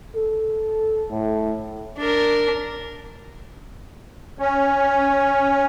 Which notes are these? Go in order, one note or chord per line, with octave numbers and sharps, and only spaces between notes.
A4
A2
D4 A#4
C#4